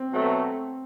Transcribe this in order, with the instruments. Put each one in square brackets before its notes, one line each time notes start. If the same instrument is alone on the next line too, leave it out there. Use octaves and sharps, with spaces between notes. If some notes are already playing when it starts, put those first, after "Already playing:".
Already playing: [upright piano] C4
[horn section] B2 F#3 A3